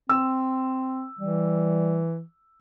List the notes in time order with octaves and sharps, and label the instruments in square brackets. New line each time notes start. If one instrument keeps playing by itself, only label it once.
[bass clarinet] C4 [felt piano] E6
[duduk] E3 [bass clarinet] G3